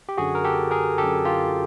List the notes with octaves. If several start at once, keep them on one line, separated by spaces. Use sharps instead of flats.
G4
F#2 D3 F#4 G#4
A#4
G4 A4
G#4 A#4
F#2 D3 G4 A4
F4 G4